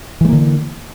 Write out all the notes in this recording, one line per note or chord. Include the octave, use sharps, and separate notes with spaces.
D3 E3 G#3 A#3